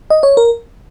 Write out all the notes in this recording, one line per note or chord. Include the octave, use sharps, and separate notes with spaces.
D#5
C#5
A#4